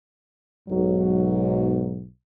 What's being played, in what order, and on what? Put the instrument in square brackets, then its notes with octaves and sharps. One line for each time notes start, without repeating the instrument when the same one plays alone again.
[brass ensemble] B1 G#2 F#3